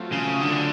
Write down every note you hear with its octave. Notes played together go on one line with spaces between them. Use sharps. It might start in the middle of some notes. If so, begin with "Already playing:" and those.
Already playing: F#3 A3 C4 F4
C#3
D3